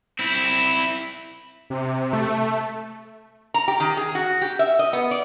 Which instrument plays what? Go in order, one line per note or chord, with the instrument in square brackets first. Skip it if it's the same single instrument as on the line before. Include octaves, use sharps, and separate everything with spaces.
[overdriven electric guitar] C4 E4
[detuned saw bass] C3
A3
[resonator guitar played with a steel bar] A#5
G4
D#3
G#4
F#4
G4
E5
D#5
B3
D5